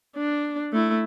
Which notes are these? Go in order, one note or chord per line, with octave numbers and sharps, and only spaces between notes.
D4
A3 E4